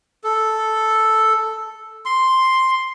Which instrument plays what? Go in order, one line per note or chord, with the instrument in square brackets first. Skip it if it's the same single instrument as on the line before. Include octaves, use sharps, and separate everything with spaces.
[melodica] A4
C6